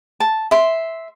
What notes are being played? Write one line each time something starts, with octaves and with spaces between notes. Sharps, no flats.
A5
E5 C6